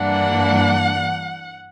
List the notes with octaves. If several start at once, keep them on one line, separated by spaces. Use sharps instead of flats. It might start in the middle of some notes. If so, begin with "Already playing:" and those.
Already playing: G2 E3 A#3 D4 F#5